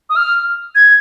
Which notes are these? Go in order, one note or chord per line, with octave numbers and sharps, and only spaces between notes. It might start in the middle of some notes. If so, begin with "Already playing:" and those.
D#6
F6
G#6